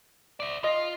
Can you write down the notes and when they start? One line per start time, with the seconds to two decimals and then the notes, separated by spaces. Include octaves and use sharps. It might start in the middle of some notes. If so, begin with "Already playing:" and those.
0.40 D5 E5
0.64 F4 D#5